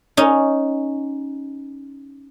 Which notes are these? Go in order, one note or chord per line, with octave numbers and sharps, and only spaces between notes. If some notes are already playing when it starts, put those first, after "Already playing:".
C#4 D#4